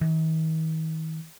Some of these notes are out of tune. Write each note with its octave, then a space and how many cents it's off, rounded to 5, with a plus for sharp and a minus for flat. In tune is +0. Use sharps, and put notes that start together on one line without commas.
D#3 +45